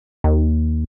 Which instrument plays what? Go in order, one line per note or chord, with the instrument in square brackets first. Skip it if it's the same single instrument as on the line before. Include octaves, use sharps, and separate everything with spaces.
[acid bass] D#2